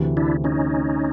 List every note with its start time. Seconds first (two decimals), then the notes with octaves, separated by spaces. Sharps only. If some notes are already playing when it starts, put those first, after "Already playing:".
Already playing: D2 C3 E3 A3
0.17 D4 E4
0.44 C#4 D#4